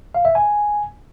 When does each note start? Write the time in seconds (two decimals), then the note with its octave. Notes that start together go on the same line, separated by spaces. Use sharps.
0.15 F5
0.25 E5
0.35 G#5